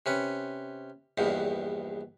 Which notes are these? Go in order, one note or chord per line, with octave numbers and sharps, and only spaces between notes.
C3 C#4 B4
A#1 E2 G2 B2